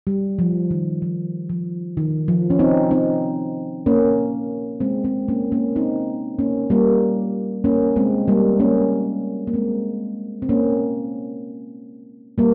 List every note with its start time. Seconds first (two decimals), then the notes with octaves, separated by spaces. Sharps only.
0.07 G3
0.39 F3
0.70 D#3
1.02 F3
1.49 F3
1.97 D#3
2.28 F3
2.50 C#4
2.59 C4 D#4
2.91 C4 D#4
3.86 A#3 C#4
4.80 G#3 C4
5.04 G#3 C4
5.28 A#3 C#4
5.52 A#3 C#4
5.76 C4 D#4
6.39 A#3 C#4
6.70 G3 A#3
7.64 A#3 C#4
7.96 G#3 C4
8.28 G3 A#3
8.59 A#3 C#4
9.47 A#3
9.54 G#3 C4
10.42 C4
10.49 A#3 C#4
12.38 G3 A#3